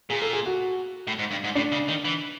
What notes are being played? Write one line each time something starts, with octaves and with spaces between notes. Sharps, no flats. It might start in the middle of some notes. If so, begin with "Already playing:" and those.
A#2 G#4
A4
G#4
F#4
A2
G#2
G2
G#2
A2 D4
C#3
D#3
E3